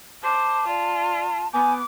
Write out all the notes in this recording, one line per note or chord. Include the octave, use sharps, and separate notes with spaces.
C5 A5 D6
F4 D5
B3 G#5 D6 G6